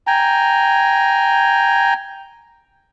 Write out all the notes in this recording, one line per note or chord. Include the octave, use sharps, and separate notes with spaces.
G5 G#5 A#5